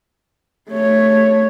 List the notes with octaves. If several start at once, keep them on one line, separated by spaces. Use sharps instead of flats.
A3 C#5